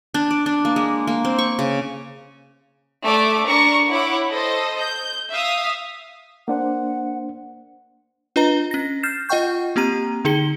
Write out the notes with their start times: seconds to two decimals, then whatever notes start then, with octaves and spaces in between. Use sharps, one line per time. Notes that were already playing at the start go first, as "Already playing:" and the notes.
0.14 D4
0.31 D5
0.46 D4
0.65 A#3
0.76 G#3
1.07 A#3
1.25 C4
1.39 C#6
1.59 C#3
3.03 A3 D5 D6
3.46 D4 A#4 D5 C#6
3.89 E4 C#5 F#5 D6
4.30 A4 C5 D#5
4.80 G6
5.30 E5 F5 D#6
6.48 A#3 D4 C5 F#5
8.36 D4 F4 B4 D#5 A#5 G7
8.71 C#4 A#6
9.03 F6 G6 A6 C7 E7
9.29 F4 D#5 F#5 G5 C#6 G6
9.76 A#3 C4 G4 A#5 D#7
10.25 D3 D#4 G#4 C#7 G7